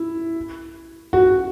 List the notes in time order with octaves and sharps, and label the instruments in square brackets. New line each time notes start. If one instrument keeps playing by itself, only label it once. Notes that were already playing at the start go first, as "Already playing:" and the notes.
Already playing: [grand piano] E4
F#4